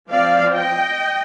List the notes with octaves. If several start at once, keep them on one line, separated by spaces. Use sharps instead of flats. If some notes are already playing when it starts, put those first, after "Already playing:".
F3 C4 D5 F5
D#5 G5